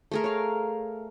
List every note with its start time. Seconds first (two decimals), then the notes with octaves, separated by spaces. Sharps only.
0.12 A3 G#4 A#4
0.24 C#5 F5